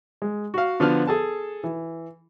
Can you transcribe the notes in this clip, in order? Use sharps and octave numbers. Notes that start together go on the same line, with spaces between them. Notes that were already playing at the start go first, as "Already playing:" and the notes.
G#3
F#4 F5
D3 F3 B3 B4 A5 F6
G#4 A4 A5
E3